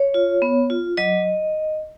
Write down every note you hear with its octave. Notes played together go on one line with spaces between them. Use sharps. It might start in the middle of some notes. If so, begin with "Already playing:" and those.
Already playing: C#5
F4
B3
F4
F#3 D#5